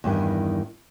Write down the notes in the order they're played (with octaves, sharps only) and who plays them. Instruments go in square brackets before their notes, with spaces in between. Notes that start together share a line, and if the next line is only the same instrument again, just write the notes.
[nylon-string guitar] E2 G2 D#3